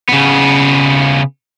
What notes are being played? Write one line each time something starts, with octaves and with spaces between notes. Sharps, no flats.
C#3 B3